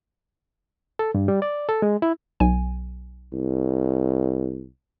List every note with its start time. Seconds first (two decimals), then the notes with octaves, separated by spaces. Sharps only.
0.99 A4
1.15 G2
1.28 G3
1.42 D5
1.69 A4
1.82 G#3
2.02 E4
2.40 B1 G#5
3.33 C2